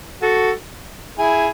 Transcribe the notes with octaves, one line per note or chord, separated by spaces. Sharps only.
F#4 A4
E4 G#4